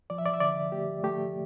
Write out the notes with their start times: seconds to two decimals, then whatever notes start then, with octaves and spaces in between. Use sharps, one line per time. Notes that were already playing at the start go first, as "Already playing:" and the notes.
0.10 F3 D5
0.18 E5
0.26 D5
0.34 E5
0.40 D3 D5
0.72 A3 G4
1.04 A3 G4